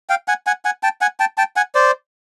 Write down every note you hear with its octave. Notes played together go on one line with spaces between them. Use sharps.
F5 G5
F#5 G#5
F#5 G#5
F#5 G#5
G5 A5
F#5 G#5
G5 A5
G5 A5
F#5 G#5
C5 D5